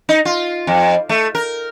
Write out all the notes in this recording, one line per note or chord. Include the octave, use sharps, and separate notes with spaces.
D#4
F4
F2
A3
A#4